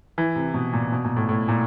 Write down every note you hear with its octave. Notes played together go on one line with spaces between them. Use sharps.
E3
C3
B2
A#2
B2
A#2
A2
A2
A#2